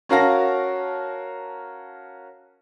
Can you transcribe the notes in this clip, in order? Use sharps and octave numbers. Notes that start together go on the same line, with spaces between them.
C#4 F#4 A#4 F5 A5 A#6